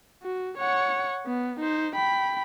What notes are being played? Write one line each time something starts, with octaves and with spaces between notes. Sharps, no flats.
F#4
C#5 F#5
B3
D#4 C5
G5 B5